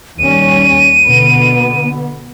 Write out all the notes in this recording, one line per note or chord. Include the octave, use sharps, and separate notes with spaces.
D#2 G3 C#4 D#7
B2 D3 B3